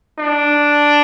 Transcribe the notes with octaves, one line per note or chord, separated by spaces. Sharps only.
D4